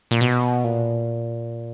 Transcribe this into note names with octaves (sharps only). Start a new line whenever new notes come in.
A#2
B2
A#2